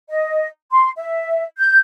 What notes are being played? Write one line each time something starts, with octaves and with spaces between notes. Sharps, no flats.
D#5
C6
E5
G6